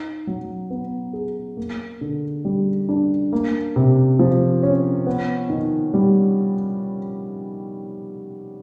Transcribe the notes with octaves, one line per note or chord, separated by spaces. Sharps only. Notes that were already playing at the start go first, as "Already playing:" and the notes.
Already playing: D#4
F#3
B3
G#4
A#3
D3
G3
D4
A#3
C3
F3
C#4
B3
D#3
G3